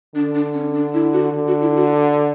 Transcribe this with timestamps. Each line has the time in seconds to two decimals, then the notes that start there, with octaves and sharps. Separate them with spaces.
0.15 D3 D4
0.35 D4
0.54 C#4
0.74 D4
0.94 E4
1.13 F#4
1.33 D3
1.48 F#4
1.62 E4
1.76 F#4